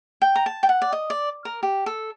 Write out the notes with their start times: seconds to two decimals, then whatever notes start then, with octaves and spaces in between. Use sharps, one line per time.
0.22 G5
0.36 A#5
0.46 A5
0.63 G5
0.69 F#5
0.82 D5
0.93 D#5
1.10 D5
1.45 A#4
1.63 G4
1.86 A4